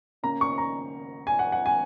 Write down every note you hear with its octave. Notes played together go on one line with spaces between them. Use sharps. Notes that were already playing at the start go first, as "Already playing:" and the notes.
C#3 A#3 C#4 A#5
C#6
A#5
G#5
F#5
F#5
G#5